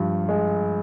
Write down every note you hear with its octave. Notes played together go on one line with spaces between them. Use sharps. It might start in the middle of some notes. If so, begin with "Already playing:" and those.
Already playing: G2 F3
G#3